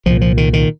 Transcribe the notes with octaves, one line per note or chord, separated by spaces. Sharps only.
C2 A#2 F3
F3
D#3
D#3